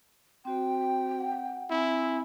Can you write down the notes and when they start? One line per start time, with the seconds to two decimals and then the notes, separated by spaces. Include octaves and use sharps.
0.45 C4 F#4 C5 G5
1.18 F#5
1.70 C4 E4 G#5